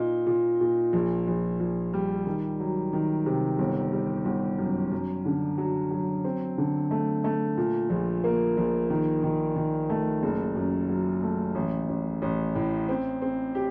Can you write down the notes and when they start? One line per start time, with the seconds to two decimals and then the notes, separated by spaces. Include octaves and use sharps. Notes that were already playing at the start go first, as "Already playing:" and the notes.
Already playing: A#2 D#4
0.27 A#2
0.61 A#2
0.93 A#1
1.27 A#1
1.60 A#1
1.93 G3
2.26 D#3
2.60 F#3
2.93 D#3
3.26 C3
3.59 G1
3.93 G3
4.25 G1
4.58 F#2
4.92 F#2
5.25 D3
5.58 F#3
5.91 F#3
6.24 C4
6.58 D3
6.91 A3
7.24 A3
7.57 A#2
7.90 A#1
8.24 A#3
8.57 A#1
8.90 D#3
9.23 D#3
9.56 D#3
9.90 A3
10.23 F#1
10.56 F#2
10.89 F#3
11.23 A3
11.55 A1
11.89 A1
12.22 A1
12.55 A2
12.88 C4
13.22 C4
13.55 G4